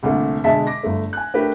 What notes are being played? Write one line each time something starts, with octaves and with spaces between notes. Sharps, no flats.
C2 A#2 D3 A3
B2 D3 G#3 E5 A5 B6
D6 A#6
G1 A3
G#5 F#6
A3 D4 G4 A#4 B4